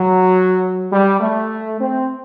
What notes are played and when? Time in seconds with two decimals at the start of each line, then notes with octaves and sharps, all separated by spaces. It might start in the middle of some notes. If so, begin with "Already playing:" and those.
Already playing: F#3
0.91 G3
1.21 A3
1.80 C4